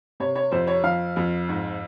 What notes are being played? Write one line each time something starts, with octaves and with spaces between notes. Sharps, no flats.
C3 C#5
C#5
F2 C5
C#5
F3 F5
F2
G#2